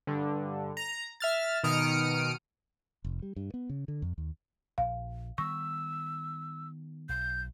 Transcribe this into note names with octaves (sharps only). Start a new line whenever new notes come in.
G2 D3
A#5
E5 F6 A6
B2 D#3 D#6 F6 C#7 D7
F1
G3
G2
B3
C#3
D3
F2
D#2
A#1 F5
D#3 G3 B3 C#6 E6
B1 G6